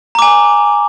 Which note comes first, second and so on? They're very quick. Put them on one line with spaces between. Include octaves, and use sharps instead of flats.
A#5 D6 G#5